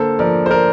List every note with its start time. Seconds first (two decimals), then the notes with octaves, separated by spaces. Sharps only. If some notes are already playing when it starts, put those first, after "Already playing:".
Already playing: D3 A#3 A4 C5
0.19 F3 A#4 D5
0.46 C5
0.51 A#4 D5